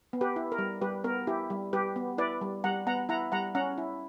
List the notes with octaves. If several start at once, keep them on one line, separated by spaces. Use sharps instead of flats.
B3
G4 B4
E4
A#4
G3
G3 G4 B4
B3 A#4
E4 G4
G3
G3 G4 B4
B3
E4 B4 D5
G3
G3 F#5 A#5
B3 F#5 A#5
E4 F#5 A#5
G3 F#5 A#5
C#4 F#5 A#5
E4